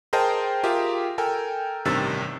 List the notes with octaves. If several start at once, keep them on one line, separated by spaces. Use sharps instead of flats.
G#4 A#4 C5 D#5 G5 A5
F4 G4 G#4 A#4 E5
A4 A#4 G5 G#5
A1 G2 C3 D#3 E6 A6